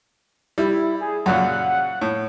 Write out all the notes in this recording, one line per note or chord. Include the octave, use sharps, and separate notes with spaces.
G3 E4
G#4
F#2 A#2 C#3 F#5
A2